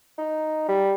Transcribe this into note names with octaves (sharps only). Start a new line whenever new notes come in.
D#4
G3